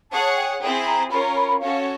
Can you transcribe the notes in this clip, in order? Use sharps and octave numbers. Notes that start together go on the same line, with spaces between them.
G#4 C#5 F#5 A5
G5
C4 E4 G#4 G5
A#5
C#4 F4 A#4 C#5 B5
A#5
B5
B5
C#4 F#4 A4 C#5 F5